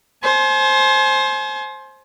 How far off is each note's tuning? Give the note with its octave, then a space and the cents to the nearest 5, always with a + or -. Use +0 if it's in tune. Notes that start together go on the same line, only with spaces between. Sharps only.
C5 +20 G#5 +40